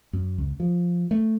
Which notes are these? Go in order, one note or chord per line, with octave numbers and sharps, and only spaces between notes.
F#2
C#2
F3
A3